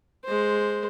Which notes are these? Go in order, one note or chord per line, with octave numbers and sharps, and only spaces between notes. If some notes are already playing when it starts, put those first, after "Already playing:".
G#3 C5